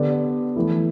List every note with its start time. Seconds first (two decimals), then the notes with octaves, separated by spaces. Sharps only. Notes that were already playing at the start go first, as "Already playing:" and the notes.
Already playing: D3 B3 G4 D5
0.56 E3 A3 E4